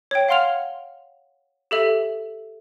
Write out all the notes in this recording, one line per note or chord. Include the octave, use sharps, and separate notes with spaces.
C#5 G5
F5 F#5 C6 F6 F7
G4 A4 E5